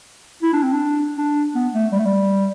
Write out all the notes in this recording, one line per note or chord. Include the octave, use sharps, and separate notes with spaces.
E4
D4
C4
D4
D4
B3
A3
G3
A3
G3